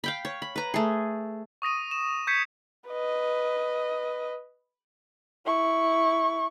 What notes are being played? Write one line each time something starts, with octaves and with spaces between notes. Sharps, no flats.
F5 G5 B5
C#5
B5
B4 A#5
A3 G#4
C#6 D#6 A#6 D#7
E7
C#6 G6 G#6 B6 C#7
B4 D#5
E4 C#6